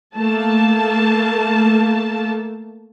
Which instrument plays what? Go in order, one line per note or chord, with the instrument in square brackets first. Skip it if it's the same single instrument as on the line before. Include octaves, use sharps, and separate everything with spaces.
[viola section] A3 A#3 A5